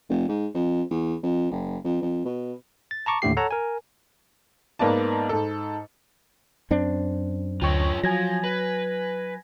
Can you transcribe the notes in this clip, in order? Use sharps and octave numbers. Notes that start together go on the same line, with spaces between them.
F1
G#2
F2
E2
F2
F#1
F2
F2
B2
A6
A5 A#5 C#6 D6
D#2 A2 D3 A3 G4 C7
A4 C#5 F#5 A5 A#5
A#4 G#5
G#2 A#3 B3 D5 A5
G#2 A4
F#2 C4 D4
D2 F4 C#5 D#5 G5 C#6
F3 F#3 G#5 G#6 A#6
B4